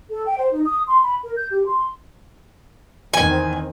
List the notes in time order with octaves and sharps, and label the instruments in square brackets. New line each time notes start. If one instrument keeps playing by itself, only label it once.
[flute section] A4
G5
C5
D#4
D#6
C6
B5
A#4
G6
G4
C6
[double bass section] E2 D#3 C4 [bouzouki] G#5